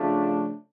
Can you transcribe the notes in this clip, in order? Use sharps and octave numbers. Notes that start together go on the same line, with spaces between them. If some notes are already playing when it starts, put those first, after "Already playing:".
Already playing: C#3 F3 A3 D4